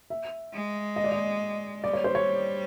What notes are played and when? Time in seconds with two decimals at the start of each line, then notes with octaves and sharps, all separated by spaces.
0.10 E5
0.54 G#3
0.96 D#5
1.04 D5
1.12 D#5
1.83 G3 D5
1.93 C#5
2.04 C5
2.15 C#5